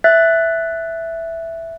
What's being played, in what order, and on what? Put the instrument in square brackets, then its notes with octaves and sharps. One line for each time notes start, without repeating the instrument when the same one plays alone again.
[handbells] E5 F#6 A6